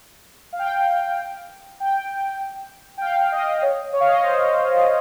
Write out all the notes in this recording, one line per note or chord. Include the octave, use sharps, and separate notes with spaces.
F5
G5
G5
G5
F5
D#5
C#5
C#5
F5
D#5
C#5
C5